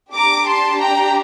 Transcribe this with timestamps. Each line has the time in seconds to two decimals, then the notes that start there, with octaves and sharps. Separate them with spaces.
0.13 D4 G4 A#5 D6
0.47 A5 C6
0.80 G5 A#5